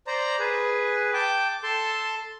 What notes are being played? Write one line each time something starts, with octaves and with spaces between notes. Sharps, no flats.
C5 D5 A#5
G#4 B4
G5 A5 D6
A4 A5 C6